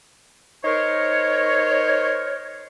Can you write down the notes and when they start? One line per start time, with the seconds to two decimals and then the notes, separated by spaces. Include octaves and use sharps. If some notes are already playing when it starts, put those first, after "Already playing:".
0.65 D#4 A#4 C5 C#5